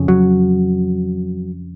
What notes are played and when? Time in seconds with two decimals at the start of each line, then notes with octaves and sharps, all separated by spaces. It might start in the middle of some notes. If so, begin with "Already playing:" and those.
Already playing: F2 C#3
0.08 F#3